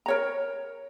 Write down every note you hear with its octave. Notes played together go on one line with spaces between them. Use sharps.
A#4 C#5 A#5